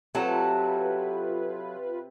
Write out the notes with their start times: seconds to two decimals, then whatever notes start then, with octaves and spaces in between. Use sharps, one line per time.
0.15 C3 F#3 F4 A4 B4